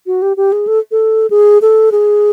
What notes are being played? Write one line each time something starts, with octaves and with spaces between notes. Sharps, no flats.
F#4
G4
G4
G#4
A4
A4
G#4
A4
G#4